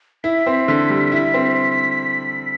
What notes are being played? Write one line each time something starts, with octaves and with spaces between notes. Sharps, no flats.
E4 B6
C4
D3
G3
E4
C4